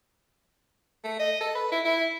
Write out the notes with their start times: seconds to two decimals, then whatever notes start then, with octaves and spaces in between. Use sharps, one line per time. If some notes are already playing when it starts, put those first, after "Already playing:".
1.04 A3
1.19 D#5
1.41 A4
1.55 B4
1.72 E4
1.85 E4